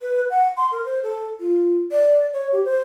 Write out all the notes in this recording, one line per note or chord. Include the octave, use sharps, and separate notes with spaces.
B4
F#5
C6
A#4
C5
A4
F4
D5
C#5
G4
C5